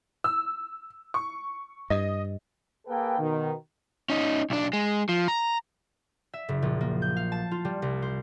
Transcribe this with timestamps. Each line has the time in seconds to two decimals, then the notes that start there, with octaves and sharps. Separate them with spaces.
0.24 E6
1.14 C#6
1.90 G2 D#5
2.88 A#3 G#4 A4 B4 G5
3.19 B2 D#3
4.10 C#4 D#4
4.50 B1 D4
4.73 G#3
5.09 F3
5.28 A#5
6.33 E5
6.49 F#1
6.62 A#1
6.81 A#3
7.02 G6
7.17 F5
7.32 A5
7.51 F4
7.65 G3
7.82 C2
8.02 C5